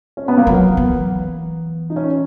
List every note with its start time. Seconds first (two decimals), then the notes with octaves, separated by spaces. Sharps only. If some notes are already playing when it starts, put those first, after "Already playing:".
0.17 C#4
0.28 B3
0.37 A#3
0.47 F#3 B3
0.77 E3
1.90 D#4
1.96 C#4